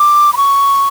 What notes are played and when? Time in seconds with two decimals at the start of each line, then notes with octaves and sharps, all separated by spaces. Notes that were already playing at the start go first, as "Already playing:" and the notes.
Already playing: D6
0.33 B5
0.37 C#6